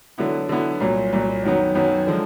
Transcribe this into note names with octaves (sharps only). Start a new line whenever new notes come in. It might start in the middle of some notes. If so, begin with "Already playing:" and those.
D3 F#3 B3 E4
D3 F#3 B3 E4
C2 A#2 F#3
C2 A#2 F#3
F#2 D#3 F#3 B3
F#2 D#3 F#3 B3
D3 F3 G#3